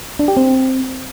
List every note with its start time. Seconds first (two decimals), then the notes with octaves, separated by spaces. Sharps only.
0.19 D4
0.28 G4
0.37 C4